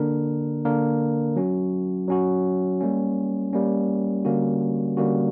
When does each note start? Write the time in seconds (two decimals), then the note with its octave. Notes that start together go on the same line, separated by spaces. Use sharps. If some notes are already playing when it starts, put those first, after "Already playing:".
Already playing: D3 A#3 D4 A#4
0.65 D3 A#3 D4 A#4
1.36 F#3 C#4 F#4
2.08 F#3 C#4 F#4
2.80 G3 A#3 C#4
3.53 G3 A#3 C#4
4.25 D3 G3 A#3 C#4 F#4
4.97 D3 G3 A#3 C#4 F#4